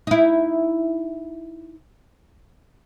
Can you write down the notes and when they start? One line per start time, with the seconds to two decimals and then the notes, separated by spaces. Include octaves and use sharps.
0.07 D#4 E4